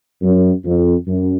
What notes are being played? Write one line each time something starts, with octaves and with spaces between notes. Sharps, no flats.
F#2
F2
F#2